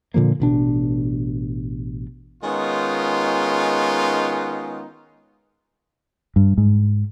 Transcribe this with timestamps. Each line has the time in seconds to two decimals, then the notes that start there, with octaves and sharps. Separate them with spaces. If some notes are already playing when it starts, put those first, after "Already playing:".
0.14 A#2 D3 F3 A#3
0.40 A1 B2 D4
2.44 D#3 G#3 B3 C#4 D#4 F4
6.36 G2
6.58 G#2